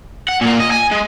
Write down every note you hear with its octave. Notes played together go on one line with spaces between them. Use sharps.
F#5
A#2 A#3
D#5
G#5
G#3